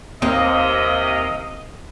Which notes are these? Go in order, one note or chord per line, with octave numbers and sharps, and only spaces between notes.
D#2 C3 A#3 C4 D#5